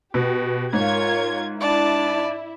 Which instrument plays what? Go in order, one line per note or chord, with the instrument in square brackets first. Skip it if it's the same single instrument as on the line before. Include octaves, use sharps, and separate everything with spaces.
[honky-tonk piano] B2 [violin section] G4
[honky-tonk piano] G#2 [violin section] F4 A#4 G#6 [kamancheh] C#5
[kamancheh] D4 A5 [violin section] E4 [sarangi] D5